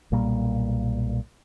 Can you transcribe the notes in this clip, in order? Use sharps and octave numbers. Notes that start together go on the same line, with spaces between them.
B1 A#2 G3 A#3